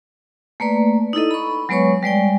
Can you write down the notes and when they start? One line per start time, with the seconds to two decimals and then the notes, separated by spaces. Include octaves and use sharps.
0.60 A3 A#3 B4 D5
1.13 D#4 E4 A4 D#5
1.31 B5 C#6
1.69 F#3 G#3 B3 B4 C#5 C#6
2.03 G3 G#3 D5 G5